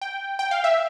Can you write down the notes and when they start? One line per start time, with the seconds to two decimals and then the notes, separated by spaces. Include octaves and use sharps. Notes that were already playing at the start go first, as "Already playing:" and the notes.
0.02 G5
0.39 G5
0.51 F5
0.64 E5